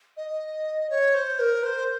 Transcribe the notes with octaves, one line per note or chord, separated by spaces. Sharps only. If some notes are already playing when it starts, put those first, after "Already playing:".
D#5
C#5
C5
A#4
C5